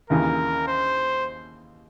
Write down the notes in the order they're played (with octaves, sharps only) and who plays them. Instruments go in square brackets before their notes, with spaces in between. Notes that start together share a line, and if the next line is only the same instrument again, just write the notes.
[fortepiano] D#2 C#3 E3 [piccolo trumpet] A#4
[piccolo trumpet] C5